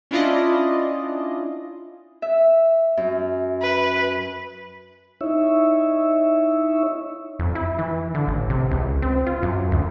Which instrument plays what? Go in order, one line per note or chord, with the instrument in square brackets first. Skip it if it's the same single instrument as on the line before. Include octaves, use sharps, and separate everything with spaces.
[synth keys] C#4 D4 E4 F4 D5 D#5
[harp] E5
F#2
[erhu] B4
[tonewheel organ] D#4 E4 C#5 E5
[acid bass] F2
E4
E3
D3
A1
C3
C#2
C4
F4
F#2
D2